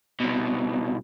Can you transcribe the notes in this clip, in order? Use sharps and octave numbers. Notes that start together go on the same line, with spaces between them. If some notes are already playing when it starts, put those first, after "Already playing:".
C2 B2